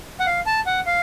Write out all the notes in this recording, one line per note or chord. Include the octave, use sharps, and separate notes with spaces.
F#5
F5
A5
F#5
F5